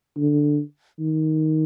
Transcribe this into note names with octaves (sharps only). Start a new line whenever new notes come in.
D3
D#3